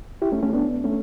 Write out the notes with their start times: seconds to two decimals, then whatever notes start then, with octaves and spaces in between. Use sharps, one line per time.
0.22 E4 G4
0.32 A3 C#4
0.43 A3 C#4
0.53 B3 D4
0.84 A3 C#4